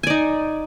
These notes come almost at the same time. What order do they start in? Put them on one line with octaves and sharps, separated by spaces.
G#5 D5 D#4